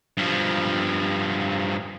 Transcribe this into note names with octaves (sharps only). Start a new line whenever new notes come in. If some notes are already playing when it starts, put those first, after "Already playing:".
G2 F3